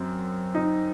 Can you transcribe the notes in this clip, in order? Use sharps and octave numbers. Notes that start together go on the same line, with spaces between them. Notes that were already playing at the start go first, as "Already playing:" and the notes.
Already playing: F#2 C4
D#4